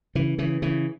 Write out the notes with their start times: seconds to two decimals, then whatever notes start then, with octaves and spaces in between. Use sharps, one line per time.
0.15 C#3 E3
0.38 C#3 E3
0.62 C#3 E3